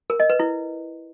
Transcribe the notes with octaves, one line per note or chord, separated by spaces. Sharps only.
A#4
D#5
B4
E4